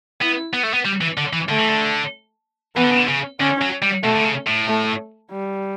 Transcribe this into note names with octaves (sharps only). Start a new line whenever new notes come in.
B3 E4
B3
A3
B3
G3
E3
D3
E3
D3 A3
E3
D3
E3 B3
D3
C#3
D3
C#3
D3 C#4
F#3
G3
B2 A3
D3
C#3
A2
A3
G3